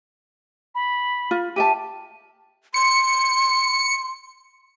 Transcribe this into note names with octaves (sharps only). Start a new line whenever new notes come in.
B5
F4
G4 E5 A5 D#7
C6 C#7